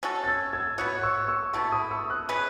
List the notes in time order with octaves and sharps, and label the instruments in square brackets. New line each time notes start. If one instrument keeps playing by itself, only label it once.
[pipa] C#4 F#4 A4
[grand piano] A6
E6 G#6
E6 G#6
[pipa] B3 F#4 C#5 [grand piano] D#6 F#6
[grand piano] F#6
C#6 E6
C#6 E6
[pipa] B2 A3 E4 [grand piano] A5 C#6
[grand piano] B5 D#6
C#6 E6
D#6 F#6
[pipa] C#4 G#4 B4